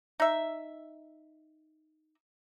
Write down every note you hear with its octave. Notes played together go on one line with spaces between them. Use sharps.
D#4 E5